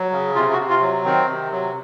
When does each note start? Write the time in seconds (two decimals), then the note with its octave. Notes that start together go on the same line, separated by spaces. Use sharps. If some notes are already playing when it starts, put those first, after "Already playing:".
Already playing: F#3
0.12 C#3
0.35 C3 F4
0.53 F#4
0.58 C3
0.70 F4
0.81 F#3
1.05 D#3 C4
1.29 C3
1.52 F#3